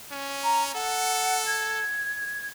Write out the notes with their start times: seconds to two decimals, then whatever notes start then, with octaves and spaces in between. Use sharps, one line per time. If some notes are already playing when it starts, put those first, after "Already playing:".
0.11 C#4
0.43 A#5
0.75 A4 F#5
1.47 G#6